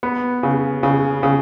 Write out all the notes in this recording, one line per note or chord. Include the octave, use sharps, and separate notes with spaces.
B3
C#3
C#3
C#3